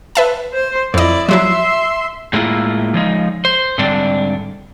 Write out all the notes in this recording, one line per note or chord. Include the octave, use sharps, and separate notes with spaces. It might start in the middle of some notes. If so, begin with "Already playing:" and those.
B4 E5 A5
C5 C6
F2 E4 D5 D#5
F3 F#3 E4 E5 C6
A2 G#3 A#3 B3 E4 F4
F3 G#3 D#4
C5
G#2 D3 G3 C4 D4 D5